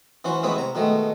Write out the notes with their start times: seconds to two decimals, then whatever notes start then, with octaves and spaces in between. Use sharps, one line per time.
0.24 E3 C#4 F#4 C5
0.43 G#3 B3 C4 E4 B4 C#5
0.56 C3 A#5
0.75 B2 D#3 G#3 A3